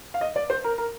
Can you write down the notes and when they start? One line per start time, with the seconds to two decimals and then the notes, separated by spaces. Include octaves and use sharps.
0.14 F5
0.21 D#5
0.36 D5
0.50 C5
0.64 A#4
0.78 A#4